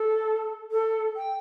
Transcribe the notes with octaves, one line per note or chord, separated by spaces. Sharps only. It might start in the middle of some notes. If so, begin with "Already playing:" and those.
Already playing: A4
A4
G5